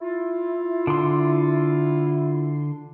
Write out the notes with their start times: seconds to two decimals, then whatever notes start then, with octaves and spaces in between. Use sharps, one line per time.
0.01 E4 F4
0.87 D3 C6